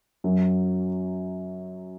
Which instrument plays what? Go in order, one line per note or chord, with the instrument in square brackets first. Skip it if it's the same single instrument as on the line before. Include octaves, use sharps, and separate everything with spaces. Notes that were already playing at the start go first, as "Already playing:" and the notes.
[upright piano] F#2 F#3